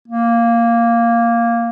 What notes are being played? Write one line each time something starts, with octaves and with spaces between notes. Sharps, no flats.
A#3